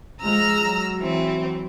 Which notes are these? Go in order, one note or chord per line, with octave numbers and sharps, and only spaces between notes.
F3 G#3 A#5 E6 F6
F#3
E3 C4